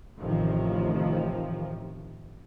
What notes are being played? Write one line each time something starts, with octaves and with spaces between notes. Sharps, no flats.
A1 C3 D#3 F3